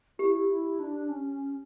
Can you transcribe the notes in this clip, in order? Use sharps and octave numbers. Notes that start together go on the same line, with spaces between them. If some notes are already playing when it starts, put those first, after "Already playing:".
E4 G4
E4
D4
C#4